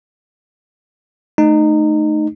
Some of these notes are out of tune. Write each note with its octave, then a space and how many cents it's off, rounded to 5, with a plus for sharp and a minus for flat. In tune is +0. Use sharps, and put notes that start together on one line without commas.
A3 -15 D#4 -20